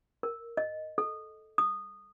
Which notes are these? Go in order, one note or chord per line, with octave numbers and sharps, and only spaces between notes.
A#4
D#5
A4
D#6